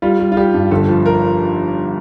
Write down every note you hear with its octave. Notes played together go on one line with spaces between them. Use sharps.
G3 F4
G3
F4
G3 G4
G2
G1 A4
F3
A#4